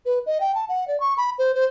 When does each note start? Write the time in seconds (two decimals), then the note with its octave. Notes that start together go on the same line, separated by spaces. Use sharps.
0.06 B4
0.26 D#5
0.40 G5
0.55 A5
0.69 F#5
0.88 D5
1.00 C#6
1.17 B5
1.39 C5
1.55 C5